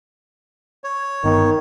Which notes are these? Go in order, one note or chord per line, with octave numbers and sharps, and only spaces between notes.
C#5
G1 G2 D#3 B3